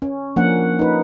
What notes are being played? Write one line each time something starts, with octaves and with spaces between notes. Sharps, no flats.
C#4
F3 A#3 C#4 D4 F#5
D#4 B4